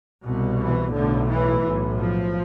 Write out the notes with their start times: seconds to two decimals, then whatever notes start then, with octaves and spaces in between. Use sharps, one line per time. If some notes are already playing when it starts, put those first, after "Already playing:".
0.24 C2 B2
0.59 E3
0.93 B1 A2 D3
1.28 E3
1.63 B1 A2
1.97 F3